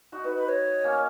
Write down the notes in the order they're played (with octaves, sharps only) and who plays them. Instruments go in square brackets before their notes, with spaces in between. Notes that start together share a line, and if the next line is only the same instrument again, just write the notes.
[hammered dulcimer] D#4 F#4
[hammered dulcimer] D#4 F#4 [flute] B4
[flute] B4
C#5
[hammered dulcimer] A#3 C#4